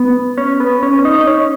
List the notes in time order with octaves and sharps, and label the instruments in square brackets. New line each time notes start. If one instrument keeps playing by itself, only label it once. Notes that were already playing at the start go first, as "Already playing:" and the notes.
Already playing: [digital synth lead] B3
C#4
B3
C#4
C#4
D#4
D#4
C#4